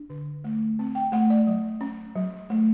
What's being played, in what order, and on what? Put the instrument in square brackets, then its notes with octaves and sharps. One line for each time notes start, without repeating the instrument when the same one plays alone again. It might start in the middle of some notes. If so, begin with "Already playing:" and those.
Already playing: [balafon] D4
D3
A3
C4
G5
A3 F#5
D5
F#3
C#4
F#3
A3